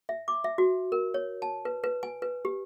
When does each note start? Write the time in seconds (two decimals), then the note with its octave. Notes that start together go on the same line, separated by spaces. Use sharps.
0.09 E5
0.28 D6
0.44 E5
0.58 F#4
0.92 A#4
1.14 C#5
1.42 A5
1.65 B4
1.84 B4
2.03 G#5
2.22 B4
2.45 G4